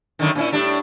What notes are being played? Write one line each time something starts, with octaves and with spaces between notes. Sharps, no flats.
F#2 D3 D#3
A#2 C#4 E4
A2 G3 D4